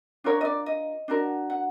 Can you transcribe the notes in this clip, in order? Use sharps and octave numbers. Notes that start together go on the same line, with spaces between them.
D4 F4 A#4 C#5
D#5
D5
D#5
D4 F#4 A#4
F#5